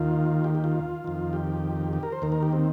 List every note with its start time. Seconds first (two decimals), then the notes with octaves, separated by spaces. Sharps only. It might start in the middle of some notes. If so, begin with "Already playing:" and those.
Already playing: D#2 D#3 F4
0.44 G4
0.55 G4
0.64 F4
1.04 F2 D#3
1.33 G4
1.93 G4
2.03 A#4
2.12 C5
2.22 D#2 D#3 A#4
2.32 A#4
2.43 G4
2.53 C4